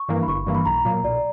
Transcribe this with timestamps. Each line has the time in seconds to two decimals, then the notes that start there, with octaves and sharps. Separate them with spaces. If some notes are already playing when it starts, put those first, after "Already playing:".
Already playing: C#6
0.09 G2 E3 A#3
0.23 B5
0.28 G1 C#6
0.47 G2 E3 A#3
0.55 B5
0.66 B1 A#5
0.85 A#2 F#3 A#3
1.04 B1 D5